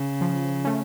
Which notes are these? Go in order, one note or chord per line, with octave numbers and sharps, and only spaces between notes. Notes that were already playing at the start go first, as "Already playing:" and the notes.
Already playing: C#3
F3
A3 C#4